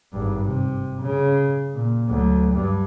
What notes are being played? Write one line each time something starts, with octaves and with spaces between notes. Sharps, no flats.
G#1 G2
C3
C#3
A#2
D2 F#3
G2